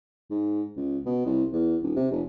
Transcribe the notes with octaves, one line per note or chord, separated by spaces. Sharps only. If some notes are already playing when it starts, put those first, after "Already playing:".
G#2
C#2
B2
C2
E2
D#1
C3
F1